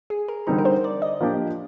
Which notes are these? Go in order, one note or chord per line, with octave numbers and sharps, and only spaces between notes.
G#4
A#4
D3 G3 C4 D#4 A#4
A#4
C5
D5
D#5
F3 A#3 D4 G4 A#4